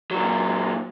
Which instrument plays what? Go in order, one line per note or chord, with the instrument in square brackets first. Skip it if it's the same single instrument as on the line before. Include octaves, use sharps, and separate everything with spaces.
[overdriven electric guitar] A#2 F#3